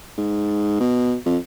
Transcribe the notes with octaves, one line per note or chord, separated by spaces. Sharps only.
G#2
B2
F2